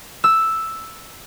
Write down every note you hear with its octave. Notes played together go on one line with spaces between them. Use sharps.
E6